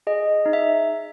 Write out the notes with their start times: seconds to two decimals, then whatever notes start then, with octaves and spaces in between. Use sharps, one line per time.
0.07 G#4 D#5
0.26 G#4
0.46 D#4
0.53 E5